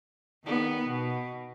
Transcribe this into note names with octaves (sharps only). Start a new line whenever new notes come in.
D#3 B3
B2